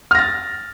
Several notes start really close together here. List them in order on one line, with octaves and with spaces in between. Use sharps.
F6 A#6 A6